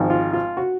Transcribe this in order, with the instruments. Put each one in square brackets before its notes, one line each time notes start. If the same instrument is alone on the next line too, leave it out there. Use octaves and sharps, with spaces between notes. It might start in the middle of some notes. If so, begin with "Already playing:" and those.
Already playing: [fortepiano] G#1 G#2 F3
F4
F4
F#4